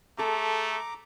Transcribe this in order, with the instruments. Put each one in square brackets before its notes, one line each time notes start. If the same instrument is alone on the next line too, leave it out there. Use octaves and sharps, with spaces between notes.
[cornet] A3 [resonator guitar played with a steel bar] G#4 A4 [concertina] A#5 D6